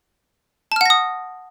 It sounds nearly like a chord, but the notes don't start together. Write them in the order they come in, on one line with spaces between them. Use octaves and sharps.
A5 F6 F#5 A#6 D#6